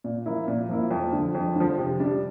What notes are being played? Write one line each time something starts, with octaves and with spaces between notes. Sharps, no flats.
A#2
F3 A#3 E4
A#2
F3 A#3 E4
F2
D3 F3
F2
D3 F3
C3
G3 D4